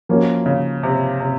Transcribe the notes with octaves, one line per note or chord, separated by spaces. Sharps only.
F3 A#3 C#4 F#4
C#3
C3
C3